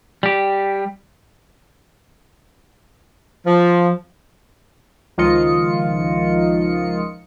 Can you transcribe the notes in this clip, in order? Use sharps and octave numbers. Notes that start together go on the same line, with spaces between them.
G3 G4
F3
C#2 D#3 F3 F4 D#5 C#7